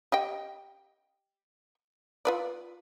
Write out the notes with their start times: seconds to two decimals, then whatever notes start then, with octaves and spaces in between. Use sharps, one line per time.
0.12 G4 D#5 G5
2.25 F4 B4 D5